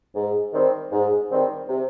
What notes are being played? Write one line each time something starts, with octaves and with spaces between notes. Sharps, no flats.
G#2
D#3 G3 C4
G#2
D#3 G3 C4
C3